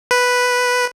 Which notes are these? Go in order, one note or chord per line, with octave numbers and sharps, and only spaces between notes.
B4